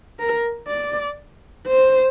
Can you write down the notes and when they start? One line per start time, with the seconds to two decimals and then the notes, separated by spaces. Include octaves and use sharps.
0.19 A#4
0.68 D5
1.67 C5